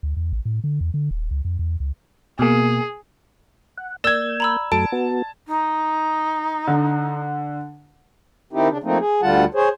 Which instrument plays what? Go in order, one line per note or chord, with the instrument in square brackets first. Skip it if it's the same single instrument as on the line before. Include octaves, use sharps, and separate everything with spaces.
[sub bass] D2
E2
A1
A2
D3
E2
D3
D#1
C#2
F2
E2
C#2
[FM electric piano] B2 A#3 [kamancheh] G#4
[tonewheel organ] F#5
[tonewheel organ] A#3 G6 [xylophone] D5 E6 [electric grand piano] G#6 E7
[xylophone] A#5 B5 E6
[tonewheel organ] F#2 F#3 A3 [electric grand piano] A5 [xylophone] D7
[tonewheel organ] B3 F#4
[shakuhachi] D#4
[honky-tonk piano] D3
[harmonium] D#3 C4 D#4 E4 G4
C#3 D4
F3 A3 A#3 C4 D#4
G#4
D2 D3 G3 F4 F#5 A5
G#4 C5 C#5